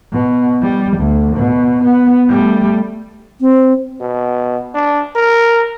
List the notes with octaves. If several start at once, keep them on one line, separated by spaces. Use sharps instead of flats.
B2
G3
D2
B2
B3
G3 A3
C4
B2
D4
A#4